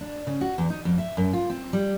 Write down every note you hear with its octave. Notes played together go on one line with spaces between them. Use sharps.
D4
C#3
F#4
E2
D#4
F2
E5
F#2
F4
C4
G3